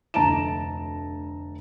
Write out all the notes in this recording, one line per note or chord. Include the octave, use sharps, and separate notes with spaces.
F1 D2 A5 A#5 D7 E7